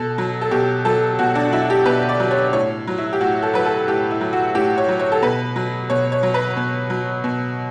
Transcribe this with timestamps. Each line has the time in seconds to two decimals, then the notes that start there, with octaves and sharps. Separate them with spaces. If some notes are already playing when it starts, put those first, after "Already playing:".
Already playing: B2 A4
0.18 F#3
0.41 A4
0.51 B2 G4
0.85 F#3 A4
1.19 B2 F#4
1.35 D4
1.53 F#3 E4
1.70 G4
1.86 B2 B4
2.09 D5
2.20 F#3
2.31 C#5
2.53 A2 C#5
2.88 F#3
2.98 E4
3.13 G4
3.21 A2 F#4
3.43 A4
3.54 F#3 B4
3.66 A4
3.88 A2 G4
4.11 E4
4.21 F#3
4.33 F#4
4.55 A2 G4
4.78 C#5
4.89 F#3
4.99 C#5
5.12 A4
5.22 B2 B4
5.56 F#3
5.90 B2 C#5
6.12 C#5
6.23 F#3
6.34 B4
6.57 B2
6.90 F#3
7.24 B2